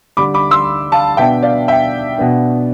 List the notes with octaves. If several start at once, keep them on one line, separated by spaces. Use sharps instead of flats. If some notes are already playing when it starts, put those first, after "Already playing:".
D3 G3 D4 B5 D6
B5 D6
C6 E6
F5 A5
B2 B3 D4 E5 G5
D5 F5
E5 G5
B2 B3 D4